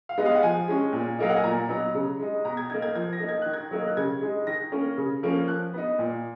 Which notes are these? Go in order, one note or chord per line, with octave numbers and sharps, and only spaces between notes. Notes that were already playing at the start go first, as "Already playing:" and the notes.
F5
G#3 B3 D#4
F5
F#5
F3 G#5
G#3 C#4
A#2
F#3 A#3 D#4 F5
F#5
G#5
A#2 A#5
F#3 B3 D#4
C#3
G#3 D#4
B2 A#5
G#6
A#3 D#4 G#6
G#6
F3 G#6
A#6
A#3 D#4
G#6
D#3 F#6
G#6
F#3 A#3 D#4
F#6
C#3 G#6
G#3 D#4
D#3 A#6
A#3 C#4
C#3
F3 A#3 C#4
F3 F#6
B3 D#4
A#2